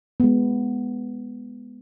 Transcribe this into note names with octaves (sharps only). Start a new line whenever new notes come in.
G#3 B3